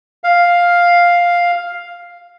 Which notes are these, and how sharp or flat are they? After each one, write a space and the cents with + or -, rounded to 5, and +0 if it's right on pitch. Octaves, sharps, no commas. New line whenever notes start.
F5 +5